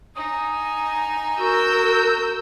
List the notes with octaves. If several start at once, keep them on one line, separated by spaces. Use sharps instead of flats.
D#4 G#5 D#6
F#4 A#4 E6 G6